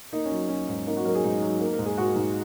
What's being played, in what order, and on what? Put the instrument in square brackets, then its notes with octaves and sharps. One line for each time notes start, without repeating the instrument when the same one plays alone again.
[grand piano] A#3 D#4
C#4
F#3
F#3 C#4
G#2
A#3 D#4
F#4
F#3 A#4
G#4
G#2 D#4
F#3
A#3
A#4
G#2
G#4
G#2 F#4
G#2